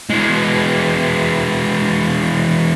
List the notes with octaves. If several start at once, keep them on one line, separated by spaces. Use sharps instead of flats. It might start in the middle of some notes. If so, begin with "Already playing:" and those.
E3 G#3